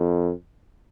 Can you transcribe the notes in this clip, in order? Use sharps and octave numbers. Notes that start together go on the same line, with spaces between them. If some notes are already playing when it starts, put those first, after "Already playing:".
Already playing: F2